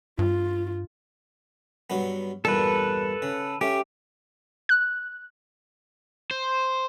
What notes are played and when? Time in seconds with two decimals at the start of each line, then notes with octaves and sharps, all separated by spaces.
0.19 G2 F4
1.90 G2 F#3 B3
2.45 E2 G2 A#2 A4 B4
3.22 C#3
3.61 A3 C#4 G4
4.69 F#6
6.31 C5